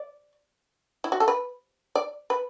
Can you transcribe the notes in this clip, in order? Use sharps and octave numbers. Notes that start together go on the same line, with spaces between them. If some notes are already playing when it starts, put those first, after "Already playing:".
Already playing: D5
E4
F#4
A4
B4
D5
B4